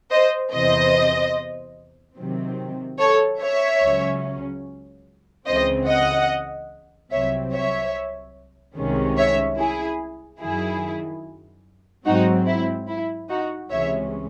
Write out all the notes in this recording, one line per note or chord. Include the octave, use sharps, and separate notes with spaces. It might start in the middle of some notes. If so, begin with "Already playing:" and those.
C5 D#5
E2 C3 E3 C5 D#5
C3 D#3 F#3 C4
A4 C#5
C#5 E5
C#2 C#3 F#3 C#4
C#2 C#3 E3 C4 C5 D#5
D#5 F#5
C2 C3 F#3 C4 C#5 E5
C#5 E5
C2 C3 D#3 G#3 C#4
C#5 E5
E4 G#4
F#2 D#3 F#3 E4 G#4
G#2 F#3 C4 D#4 F#4
E4
E4
D#4 F#4
C#2 C3 E3 G#3 C#4 C#5 E5